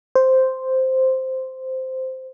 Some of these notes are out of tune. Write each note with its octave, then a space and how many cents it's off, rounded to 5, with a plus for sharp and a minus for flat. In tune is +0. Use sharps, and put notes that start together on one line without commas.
C5 -5